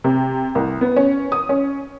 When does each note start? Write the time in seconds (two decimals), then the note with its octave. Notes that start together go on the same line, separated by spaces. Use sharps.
0.04 C3
0.55 C2
0.81 B3
0.96 C#4
1.32 D#6
1.49 C#4